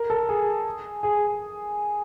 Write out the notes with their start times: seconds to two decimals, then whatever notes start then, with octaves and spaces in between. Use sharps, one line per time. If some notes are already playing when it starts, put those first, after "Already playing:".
Already playing: A#4
0.10 A4
0.29 G#4
1.03 G#4